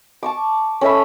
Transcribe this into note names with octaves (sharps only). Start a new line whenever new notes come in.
A5 C#6 D6
C#4 A4 E5 B5